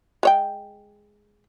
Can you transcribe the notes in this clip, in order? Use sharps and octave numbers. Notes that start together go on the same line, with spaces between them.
G#3 C#5 G5